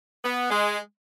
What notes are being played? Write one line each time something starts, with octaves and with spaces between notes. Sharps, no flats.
B3
G#3